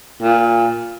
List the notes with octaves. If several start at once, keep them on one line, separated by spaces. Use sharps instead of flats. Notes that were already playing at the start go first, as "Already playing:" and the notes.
A#2